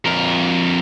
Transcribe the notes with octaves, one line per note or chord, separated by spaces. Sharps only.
F2 A#4